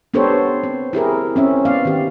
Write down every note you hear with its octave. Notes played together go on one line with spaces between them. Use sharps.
B3 D4 G4 A4 C5 C#5
C4
E4 G4 G#4 A#4
C4 C#4 E5
B3 D5 F5
D#3 G4